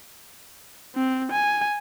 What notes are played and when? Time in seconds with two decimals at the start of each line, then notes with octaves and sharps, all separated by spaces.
0.95 C4
1.32 G#5